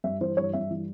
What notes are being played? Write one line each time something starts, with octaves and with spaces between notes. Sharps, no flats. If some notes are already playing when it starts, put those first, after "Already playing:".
G2 E5
E3 C5
G2 C#5
G2 E5
E3